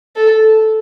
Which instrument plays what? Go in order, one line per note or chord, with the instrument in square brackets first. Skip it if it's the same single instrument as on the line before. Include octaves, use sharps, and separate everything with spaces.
[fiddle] A4